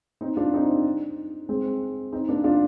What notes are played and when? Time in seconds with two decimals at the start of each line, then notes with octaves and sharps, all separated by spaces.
0.21 C4 D#4
0.37 D4 F4
0.53 C4 D#4
1.49 G#3 C4
2.13 C4 D#4
2.29 A#3 D4
2.44 D4 F4